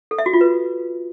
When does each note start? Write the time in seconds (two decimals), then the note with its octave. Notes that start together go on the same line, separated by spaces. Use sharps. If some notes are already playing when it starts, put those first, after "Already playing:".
0.11 A4
0.19 E5
0.26 F#4
0.33 F4
0.41 B4